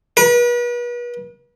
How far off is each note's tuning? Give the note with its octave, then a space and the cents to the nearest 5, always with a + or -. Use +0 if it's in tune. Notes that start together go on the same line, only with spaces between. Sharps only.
B4 -40